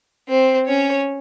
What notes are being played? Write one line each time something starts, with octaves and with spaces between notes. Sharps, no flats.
C4 C5
C#4 C#5